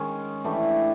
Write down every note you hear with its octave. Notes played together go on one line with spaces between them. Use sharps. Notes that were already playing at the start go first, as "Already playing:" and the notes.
Already playing: D#3 G#3 C#4
E3 A3 D4 G4